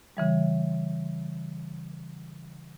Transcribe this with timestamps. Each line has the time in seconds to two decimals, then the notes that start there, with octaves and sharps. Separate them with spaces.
0.17 C#3 E3 G3